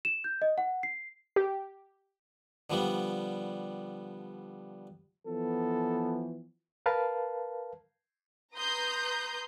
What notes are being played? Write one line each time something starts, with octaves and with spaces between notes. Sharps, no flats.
E7
G6
D#5
F#5
C7
G4
D3 F3 G3 B3
E3 F3 B3 A4
A#4 B4 F5 A5
B4 A#5 C6 D#6 G6